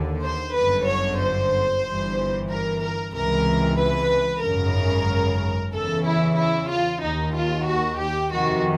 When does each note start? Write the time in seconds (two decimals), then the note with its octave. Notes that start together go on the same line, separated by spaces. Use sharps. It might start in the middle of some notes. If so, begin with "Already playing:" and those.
Already playing: D#2 D3
0.23 C5
0.55 G1 F#2 D3 B4
0.87 C#5
1.20 C5
1.85 G1 G2 E3
2.49 A#4
2.82 A#4
3.14 C#2 C3 E3 A#4
3.79 B4
4.44 G#1 F#2 C#3 A#4
5.73 E2 C#3 E3 A4
6.05 E4
6.37 E4
6.70 F4
7.02 D#2 D#3 D#4
7.35 F4
7.67 F#4
7.99 G4
8.32 F2 C3 D#3 F#4